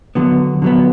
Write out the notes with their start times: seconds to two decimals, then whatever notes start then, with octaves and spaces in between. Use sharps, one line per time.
0.15 D3 F#3 B3
0.62 D3 F#3 B3